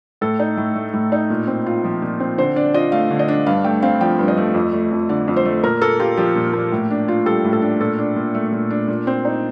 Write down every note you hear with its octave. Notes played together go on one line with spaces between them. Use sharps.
A2 A4
D#4
A2
A3
A2
D#4
A#2
C4
F4
F3
A#2
C4
D3 C5
D4 D5
F4 D#5
A3 F5
D3
D#5
D4
G2 F5
A3 G5
C4 F5
F3 G5
G2
D#5
A3
F2
A3
F2
D3 D5
F2
C5
A3
A#2 A#4
A#3 A4
F4 G4
F3 G4
A#2
A#3
A2
D4
F4
G3 A4
A2
A4
D4
A#2 A4
D4
A#2
A3
A#2
D4
A#2
C4
D#4